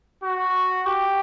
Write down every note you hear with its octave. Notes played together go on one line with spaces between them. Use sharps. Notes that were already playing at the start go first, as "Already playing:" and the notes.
F#4
G4